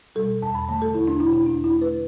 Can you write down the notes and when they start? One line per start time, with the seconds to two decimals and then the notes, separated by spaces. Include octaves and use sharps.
0.15 B2 G3 A4
0.42 E2 A5
0.55 B5
0.68 D3 A3 A5
0.82 A4
0.94 E2 E4
1.08 D4
1.20 B2 A3 E4
1.33 E4
1.46 E2 D4
1.64 E4
1.73 D3 A3
1.81 B4